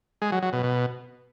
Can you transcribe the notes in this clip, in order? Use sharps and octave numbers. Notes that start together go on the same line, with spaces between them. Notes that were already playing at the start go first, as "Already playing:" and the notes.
G#3
F#3
F#3
B2
B2